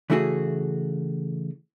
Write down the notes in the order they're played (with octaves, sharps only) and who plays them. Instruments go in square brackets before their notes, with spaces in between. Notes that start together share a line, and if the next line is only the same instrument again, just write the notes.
[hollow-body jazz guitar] C#3 E3 A3 E4 F#4 G#4